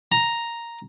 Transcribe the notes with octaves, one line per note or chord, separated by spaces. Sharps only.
A#5